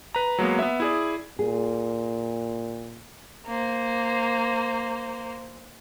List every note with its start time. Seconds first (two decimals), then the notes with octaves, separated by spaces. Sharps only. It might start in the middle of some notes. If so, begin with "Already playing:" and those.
0.15 B4 A#5
0.38 F#3 G#3 A#3 B3
0.59 B3 E5
0.80 E4 G#4 D5
1.39 A#2 G#4
3.47 A#3 C5